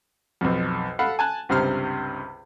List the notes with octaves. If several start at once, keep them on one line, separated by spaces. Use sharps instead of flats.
B1 F2
A4 F5 F#5 B5
G#5 A5 F#6
C#2 G2 C3 C5 F6